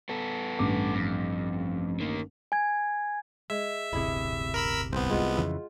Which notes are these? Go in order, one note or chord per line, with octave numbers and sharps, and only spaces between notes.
B3 A4
A1 G2 D6
F2
D#3 A#3
G#5 G#6
G#3 E5
D1 G1 C3 E4 G#4
A#4 B5 E6
C2 B3 C5
G#3 F4 F#5
F2 C#3 E3